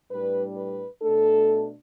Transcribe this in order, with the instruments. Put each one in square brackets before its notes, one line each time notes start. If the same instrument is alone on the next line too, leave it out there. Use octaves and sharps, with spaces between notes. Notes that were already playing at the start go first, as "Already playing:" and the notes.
[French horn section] A2 G3 D4 B4
B4
B2 A3 D4 A4